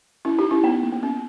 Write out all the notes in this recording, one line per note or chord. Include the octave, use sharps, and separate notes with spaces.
C#4 E4
D#4 G4
C#4 E4
B3 D#4
A#3
B3
C#4